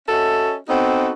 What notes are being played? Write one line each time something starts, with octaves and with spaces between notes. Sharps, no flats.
C#4 F#4 A4 D#5 E5
B3 C4 D#4 F#4 A4